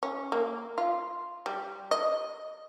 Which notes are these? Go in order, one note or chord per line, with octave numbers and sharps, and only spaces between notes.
C#4
A#3
F4
G3
D#5